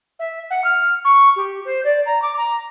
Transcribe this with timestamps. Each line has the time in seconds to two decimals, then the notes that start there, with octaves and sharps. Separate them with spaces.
0.19 E5
0.50 F#5
0.64 F6
1.04 C#6
1.36 G4
1.65 C5
1.84 D5
2.05 A#5
2.22 D6
2.37 A#5